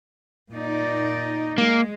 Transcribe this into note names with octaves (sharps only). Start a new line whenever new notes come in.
A#2 D#4 D5
G#3 A#3